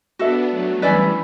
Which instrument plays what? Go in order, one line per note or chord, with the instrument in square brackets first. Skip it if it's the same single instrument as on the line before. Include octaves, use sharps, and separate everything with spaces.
[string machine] B3 D4 [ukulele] F#4 A4 E5
[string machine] F#3 A3
[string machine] E3 G3 [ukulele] C#4 E4 B4 D5